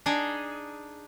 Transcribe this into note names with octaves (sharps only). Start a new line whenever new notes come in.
D4 D#4 G#4